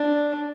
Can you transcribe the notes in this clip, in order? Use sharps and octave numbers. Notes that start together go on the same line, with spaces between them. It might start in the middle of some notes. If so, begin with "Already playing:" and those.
Already playing: D4